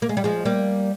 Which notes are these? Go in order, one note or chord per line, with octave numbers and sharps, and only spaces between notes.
A#3
G#3
G3
F3 G#3
G3 A#3